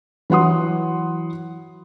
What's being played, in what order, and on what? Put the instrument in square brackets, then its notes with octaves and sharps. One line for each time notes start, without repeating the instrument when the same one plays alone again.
[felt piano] E3 F#3 F#5 C6 D#6